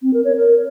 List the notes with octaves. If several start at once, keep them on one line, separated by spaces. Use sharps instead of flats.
C4
A#4
C#5
A#4